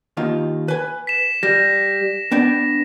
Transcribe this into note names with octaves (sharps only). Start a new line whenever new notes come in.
D#2 D#3 F4
B4 G#5
B6 E7
G3 A#6
B3 D4 G5